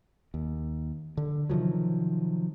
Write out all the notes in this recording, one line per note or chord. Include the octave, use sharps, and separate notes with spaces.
D#2
D3
C3 D#3 F3 F#3